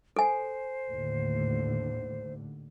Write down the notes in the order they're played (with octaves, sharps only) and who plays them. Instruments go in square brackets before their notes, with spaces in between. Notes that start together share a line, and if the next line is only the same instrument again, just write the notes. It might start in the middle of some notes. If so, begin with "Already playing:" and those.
[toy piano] A4 G#5 [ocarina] C5
[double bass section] D#2 A2 D3